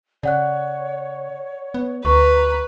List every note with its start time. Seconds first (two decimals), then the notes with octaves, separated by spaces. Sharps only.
0.23 C#3 C#5 D5 F#5 F#6
1.74 B3
2.05 D2 B4 A#5 C#6